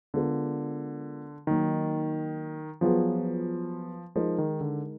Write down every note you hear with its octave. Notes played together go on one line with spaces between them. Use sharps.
D3 G#3 B3 F4 A#4
D#3 F#3 A#3 D#4
F3 F#3 B3 F4 G#4 B4
F3 G#3 D#4 A#4
D#3
D3